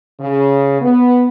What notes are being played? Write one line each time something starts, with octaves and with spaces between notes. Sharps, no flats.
C#3
B3